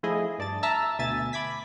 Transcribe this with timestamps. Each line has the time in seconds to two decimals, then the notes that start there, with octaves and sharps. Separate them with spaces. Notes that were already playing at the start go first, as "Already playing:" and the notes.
0.03 F3 A3 E4 G#4 D#5
0.39 G2 D5 A5 A6
0.63 E5 A5 A#5 E6 F6
0.99 D2 B2 E5 G#5 A6
1.33 B5 D6 G#6 B6